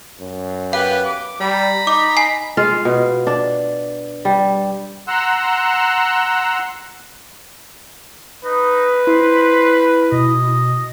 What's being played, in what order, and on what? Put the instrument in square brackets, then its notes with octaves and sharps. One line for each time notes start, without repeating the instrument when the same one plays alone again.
[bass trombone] F#2
[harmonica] B3 G4 B4 [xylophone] F5
[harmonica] D6
[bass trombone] G3 [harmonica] A#5 B5
[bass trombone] D#4 [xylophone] D6
[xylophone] G#5 C7
[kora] G#3 F4 F5
B2
D4
G3
[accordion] F#5 A#5 C6 E6 F#6
[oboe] D#4 [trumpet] B4
[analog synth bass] E4 [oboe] C5
[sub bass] B2 [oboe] D#5